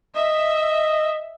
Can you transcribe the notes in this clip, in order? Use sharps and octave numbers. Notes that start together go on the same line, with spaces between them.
D#5 E5